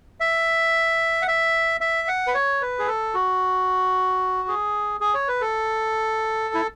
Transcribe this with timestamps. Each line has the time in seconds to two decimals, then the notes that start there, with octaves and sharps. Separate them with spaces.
0.20 E5
1.22 F#5
1.27 E5
1.81 E5
2.08 F#5
2.27 B4
2.34 C#5
2.61 B4
2.79 G#4
2.87 A4
3.14 F#4
4.48 G#4
5.01 G#4
5.14 C#5
5.28 B4
5.41 A4
6.54 E4